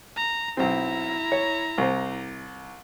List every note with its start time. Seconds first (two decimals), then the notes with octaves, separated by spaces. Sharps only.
0.16 A#5
0.57 B1 C4 E4 A#5
1.32 C#5
1.78 C2 C5